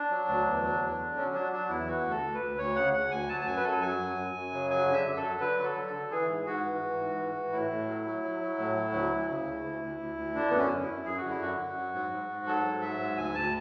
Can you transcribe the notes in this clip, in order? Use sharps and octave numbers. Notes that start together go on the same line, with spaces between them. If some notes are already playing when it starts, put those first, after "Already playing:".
Already playing: D4
F#3
D2
E2
F#3
E2
D3
F#3 C#4
F#3 D4
F#3 D4
E2 E4
E3 F#4
D2
A4
D2
B4
D2
D2 C#5
C#3 F#5
D2 F#5
D2 G#5
F#3 A5
A5
F#2 G#5
B4
F#2 A4
F#3 G#5
F#2
F#2
F#2
C#3
F#3 G#5
D3
E5
F#2
A4
F#3
D3 B4
F#3
A4
D3
A4
D3
E3 G#4
G#2
G#2 F#4
E3
E3
G#2
E3
E3
A2 E4
A2
F#3
F#3
F#3
F#3
A2
F#3
D2
D2
C#3
D2
D2
D2
D2
D2
D3 D4
F#2 B3
C#4
F#2
E4
F#2
F#2 G#4
F#4
D3
E4
F#2 F#4
F#2
F#3
G#2
G#2
G#2
F#3 A4
G#2
F#3 E5
G#2
D2 G#5
D2 A5